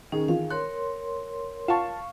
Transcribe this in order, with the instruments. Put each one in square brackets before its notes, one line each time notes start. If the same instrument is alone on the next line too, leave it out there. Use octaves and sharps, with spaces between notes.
[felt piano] D#3 G#4 [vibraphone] C#4
[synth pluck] E3 C4 F4 [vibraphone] F5
[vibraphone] A#4 C#5 C6 [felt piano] F#6
[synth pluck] F4 F#5 [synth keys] F5 C#6 [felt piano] A5 E7